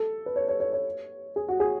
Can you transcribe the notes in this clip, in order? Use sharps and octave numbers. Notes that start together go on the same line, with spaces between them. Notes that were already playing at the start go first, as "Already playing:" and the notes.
Already playing: A4
B4
C#5
C#5
C#5
C#5
G#4
F#4
G#4